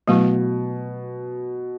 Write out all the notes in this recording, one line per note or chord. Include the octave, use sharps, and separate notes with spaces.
B2 F#3 A3 E4